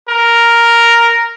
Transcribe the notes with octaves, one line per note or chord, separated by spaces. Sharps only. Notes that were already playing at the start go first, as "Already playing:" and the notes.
A#4